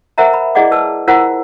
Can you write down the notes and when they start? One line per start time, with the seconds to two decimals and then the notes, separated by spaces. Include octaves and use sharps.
0.18 A#4 C5 E5 F#5 A#5
0.33 B5
0.55 E4 G#4 D5 D#5 F#5 D6
0.72 B4 A5 E6
1.07 E4 F4 A#4 C5 F#5 E6